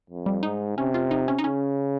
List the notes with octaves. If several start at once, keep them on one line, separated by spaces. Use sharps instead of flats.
F2
G3
G#2 D#4
C3 C#4
F4
D#4
C#4
D#4
C#3 C#4